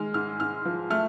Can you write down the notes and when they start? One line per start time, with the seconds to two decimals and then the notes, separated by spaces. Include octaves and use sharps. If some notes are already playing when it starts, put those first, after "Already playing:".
Already playing: D#3 G#3 F6
0.14 G#2 F6
0.40 G#2 F6
0.65 F3
0.90 A3 F6